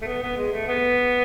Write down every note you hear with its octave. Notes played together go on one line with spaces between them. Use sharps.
A3
B3
B3
G#3
A3
B3